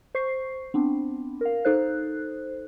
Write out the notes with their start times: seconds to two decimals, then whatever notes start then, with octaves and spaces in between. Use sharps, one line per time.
0.15 C5 C#6 C7
0.74 B3 C4 D4
1.41 A#4 F5
1.65 D#4 A4 C5 F#6